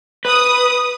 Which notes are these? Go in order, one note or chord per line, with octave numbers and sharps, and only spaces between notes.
B4 D#6